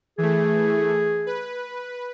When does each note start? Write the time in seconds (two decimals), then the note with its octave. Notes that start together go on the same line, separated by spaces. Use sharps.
0.18 E3 A3 G#4
1.26 B4